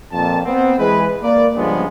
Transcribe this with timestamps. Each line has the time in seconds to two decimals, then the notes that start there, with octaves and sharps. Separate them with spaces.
0.12 F2 A#2 A5
0.44 B3 C4
0.79 E3 G#3 G#4 B4
1.22 A#3 D5
1.56 C#2 G2 C#3 F3 G#3 B3